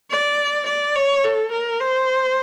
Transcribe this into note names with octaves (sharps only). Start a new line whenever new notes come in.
D5
D5
C#5
A4
A#4
C5